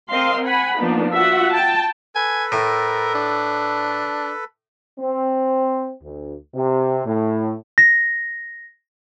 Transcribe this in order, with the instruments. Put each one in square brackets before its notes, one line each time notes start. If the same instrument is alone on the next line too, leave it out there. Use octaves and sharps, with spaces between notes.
[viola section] C4 A#4 D#5 F5 C6
F#5 G#5 B5
F3 A#3 B3 D4 D#4
F4 F#4 E5 F#5
G5 A5
[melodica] A4 B4 [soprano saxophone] G#5
[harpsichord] A2 [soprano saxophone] A#4
[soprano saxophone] D4
[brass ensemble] C4
D2
C3
A2
[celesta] A#6